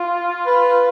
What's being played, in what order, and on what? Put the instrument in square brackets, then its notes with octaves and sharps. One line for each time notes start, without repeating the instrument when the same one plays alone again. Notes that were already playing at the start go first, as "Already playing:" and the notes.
Already playing: [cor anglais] F4
[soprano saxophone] B4